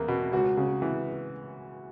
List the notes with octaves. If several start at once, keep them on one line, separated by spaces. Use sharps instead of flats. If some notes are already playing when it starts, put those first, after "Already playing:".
Already playing: E2 A#3
B2
C#2 F#4
C#3
E3